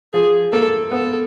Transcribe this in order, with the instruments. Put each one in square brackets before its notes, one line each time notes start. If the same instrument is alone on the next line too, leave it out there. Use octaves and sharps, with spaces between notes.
[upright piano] F3 [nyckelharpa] G#4
[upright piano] A#3 [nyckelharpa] A4
[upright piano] B3 [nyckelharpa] A4